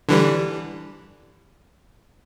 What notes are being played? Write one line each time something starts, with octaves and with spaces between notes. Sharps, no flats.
D3 E3 G3